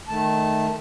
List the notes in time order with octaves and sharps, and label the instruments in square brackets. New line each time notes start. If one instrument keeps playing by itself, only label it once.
[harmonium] D#3 A3 A5